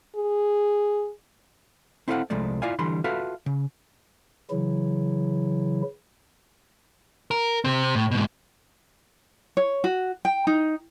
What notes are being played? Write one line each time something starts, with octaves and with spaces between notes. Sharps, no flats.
G#4
C4 E4 A4 C5 F5 F#5
C2 F3 G#3 A3 D5
E4 F4 D5 F5 G#5
D3 E3 G3 B5 C6
F4 F#4 A4 B4 E5 F5
C#3
C#3 E3 F#3 E4
A#4
C3 C4
A2
G#2 B2
C#5
F#4
G5
D#4